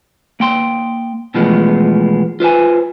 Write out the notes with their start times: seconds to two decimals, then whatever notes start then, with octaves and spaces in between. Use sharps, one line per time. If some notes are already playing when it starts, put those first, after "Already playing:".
0.40 A#3 G5 C6
1.34 B2 E3 F3 G#3 A3 B3
2.40 F4 B4 C5 G#5